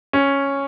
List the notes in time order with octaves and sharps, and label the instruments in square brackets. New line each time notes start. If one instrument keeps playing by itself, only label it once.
[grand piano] C#4